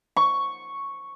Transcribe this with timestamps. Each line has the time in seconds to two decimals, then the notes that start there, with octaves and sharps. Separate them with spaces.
0.16 C#6